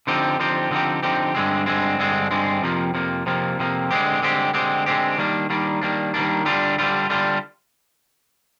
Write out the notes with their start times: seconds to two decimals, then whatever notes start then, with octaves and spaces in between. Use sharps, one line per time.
0.07 D3 F3 C4 D#4 G4
0.39 D3 F3 C4 D#4 G4
0.71 D3 F3 C4 D#4 G4
1.02 D3 F3 C4 D#4 G4
1.35 G2 D3 G#3 C4
1.66 G2 D3 G#3 C4
1.99 G2 D3 G#3 C4
2.31 G2 D3 G#3 C4
2.62 F2 C3 F3 A#3
2.94 F2 C3 F3 A#3
3.26 F2 C3 F3 A#3
3.58 F2 C3 F3 A#3
3.91 D3 G#3 C4 G4
4.22 D3 G#3 C4 G4
4.54 D3 G#3 C4 G4
4.86 D3 G#3 C4 G4
5.18 D#3 G3 A#3 D4
5.50 D#3 G3 A#3 D4
5.81 D#3 G3 A#3 D4
6.14 D#3 G3 A#3 D4
6.45 D3 G3 D4 F4
6.78 D3 G3 D4 F4
7.09 D3 G3 D4 F4